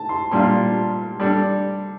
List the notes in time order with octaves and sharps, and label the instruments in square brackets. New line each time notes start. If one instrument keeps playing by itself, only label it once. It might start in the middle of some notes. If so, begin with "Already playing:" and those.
Already playing: [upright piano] A5
C6
[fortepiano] A#2 G3 D4 F4 [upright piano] C6
[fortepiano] G3 D4 A4